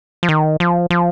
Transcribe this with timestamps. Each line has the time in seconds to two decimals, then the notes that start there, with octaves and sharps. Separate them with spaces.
0.23 F3
0.29 D#3
0.60 F3
0.90 F3